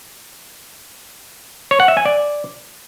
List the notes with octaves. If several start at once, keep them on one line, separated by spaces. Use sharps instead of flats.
C#5
F#5
E5
G#5
D5